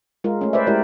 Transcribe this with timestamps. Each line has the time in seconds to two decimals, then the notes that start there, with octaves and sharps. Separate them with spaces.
0.24 G#3 F4 A#4
0.41 A3 C#4
0.53 B4 C5 D5 E5
0.67 G#3 A3 E4 G4 A#4 D5